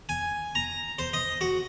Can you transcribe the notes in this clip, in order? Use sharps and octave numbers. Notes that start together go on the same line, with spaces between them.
G#5
A#5
C5
D#5
F#4